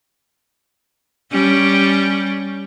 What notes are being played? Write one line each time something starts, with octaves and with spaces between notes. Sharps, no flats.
G3 C#4